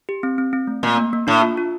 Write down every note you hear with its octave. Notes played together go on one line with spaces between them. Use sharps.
G4
C4
C4
C4
A3
A#2 A#3
A#3
A#3
A2 D4
F4
F4